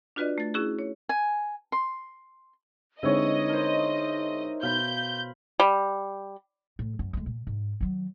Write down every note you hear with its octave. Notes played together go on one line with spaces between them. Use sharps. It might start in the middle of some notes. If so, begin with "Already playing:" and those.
D4 F4 F#4 B4 D5 D#5
A3 A6
C#4 E4 F#4 G#4
C#5
G#5
C6
D3 G#3 C4 D#4 E4 B4 C#5 D#5
A#4 C5
B2 F5 B5 C6 G6
G3
A2
F#2
D2 G#3
A#2
G#2
D#3 F#3